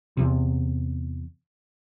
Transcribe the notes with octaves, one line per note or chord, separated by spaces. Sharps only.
E2 C3